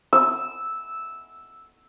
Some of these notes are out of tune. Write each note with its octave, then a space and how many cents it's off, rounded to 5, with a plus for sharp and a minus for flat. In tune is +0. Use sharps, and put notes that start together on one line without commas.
E6 -5